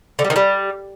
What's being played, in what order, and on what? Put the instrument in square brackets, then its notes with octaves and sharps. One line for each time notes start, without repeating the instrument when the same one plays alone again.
[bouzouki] D3
G3
D#3
G3